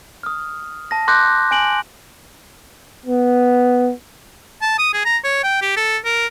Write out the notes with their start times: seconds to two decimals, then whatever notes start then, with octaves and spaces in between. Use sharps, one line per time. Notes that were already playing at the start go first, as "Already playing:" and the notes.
0.23 D#6 F6
0.91 A5 A#6
1.08 C6 D6 F#6 G6 A#6
1.51 G#5 D7 F#7
3.06 B3
4.62 A5
4.78 D#6
4.94 G#4
5.05 A#5
5.24 C#5
5.43 G5
5.62 G4
5.76 A4
6.05 A#4